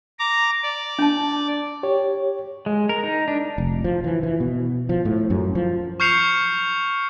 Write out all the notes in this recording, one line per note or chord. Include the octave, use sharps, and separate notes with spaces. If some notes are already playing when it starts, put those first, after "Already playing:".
A#5 D6
D5
D4 A5
G4 C#5
G#3
A#4
D#4
D4
F1
F3
E3
E3
B2
F3
A2
F#2
F3
C#6 F6 G6 C7 C#7 F7